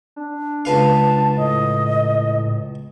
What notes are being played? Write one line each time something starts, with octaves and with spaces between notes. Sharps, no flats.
D4
C#2 B4 F5 A5
A2 D#5